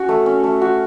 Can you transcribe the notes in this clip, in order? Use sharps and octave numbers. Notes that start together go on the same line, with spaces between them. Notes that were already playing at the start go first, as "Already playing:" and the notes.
Already playing: C#4 F#4
A3
C#4
A3
F#4